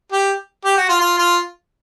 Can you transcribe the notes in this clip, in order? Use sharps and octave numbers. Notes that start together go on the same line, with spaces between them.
G4
G4
F#4
F4
F4
F4